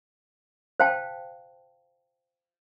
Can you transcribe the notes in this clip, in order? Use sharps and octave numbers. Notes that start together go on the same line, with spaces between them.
C5 F5 G5 A5